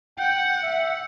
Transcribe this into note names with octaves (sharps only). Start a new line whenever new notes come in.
F#5 G5
E5